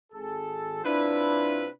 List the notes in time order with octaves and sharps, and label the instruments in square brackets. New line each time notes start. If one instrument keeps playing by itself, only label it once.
[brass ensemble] G#1 G#4 A4
[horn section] C3 F4 B4 [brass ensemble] D4 E4